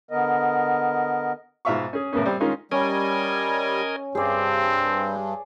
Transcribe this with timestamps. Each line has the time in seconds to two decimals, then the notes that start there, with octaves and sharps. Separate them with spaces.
0.11 D3 B3 A#4 D#5
1.65 G#2 B2 F4 E5 F5 C#6
1.93 C#4 G#4
2.13 A2 C#3 A#3 B3 C#4
2.25 G3 C4
2.40 D#3 G#3 C#4 D#4 F4 A#4
2.71 G3 C#4 A#4 D#5 G#5
4.15 G2 G3 C4 G#4 D5